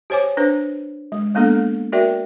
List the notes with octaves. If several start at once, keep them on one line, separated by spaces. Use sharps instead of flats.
G4 C5 C#5 G#5 D6
D4 B4 C5
G#3
G#3 A#3 B3 D4 A4
F#4 A#4 D5 E5 G5